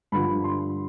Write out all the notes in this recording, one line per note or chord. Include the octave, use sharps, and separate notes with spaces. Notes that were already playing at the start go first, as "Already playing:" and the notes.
G2 D3 F3 B5
C6